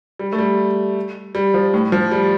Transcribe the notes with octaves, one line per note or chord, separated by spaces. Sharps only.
G3
A3
G3
G3
F3
A2
F3
G3